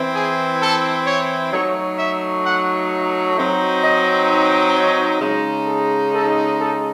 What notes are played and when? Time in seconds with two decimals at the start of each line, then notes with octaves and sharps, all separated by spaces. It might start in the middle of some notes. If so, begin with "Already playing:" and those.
Already playing: E3 C4 E4
0.15 G#4
0.61 A4
1.06 C#5
1.52 F#3 A3 D#4 C#5
1.98 E5
2.45 F#5
3.37 F#3 C4 D#4
3.83 D#5
4.75 C#5
5.21 C#3 G#3 D#4
5.66 A4
6.13 A4
6.59 A4